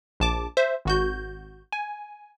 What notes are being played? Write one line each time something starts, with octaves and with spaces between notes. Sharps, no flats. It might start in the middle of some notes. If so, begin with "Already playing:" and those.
A#1 A5 D6
C5 E5
G#1 F#4 G6
G#5